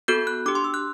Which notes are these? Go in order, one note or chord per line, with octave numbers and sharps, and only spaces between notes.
B3 F#4 A4 G6
F#6
D4 G4 D6
C6
E6
F#6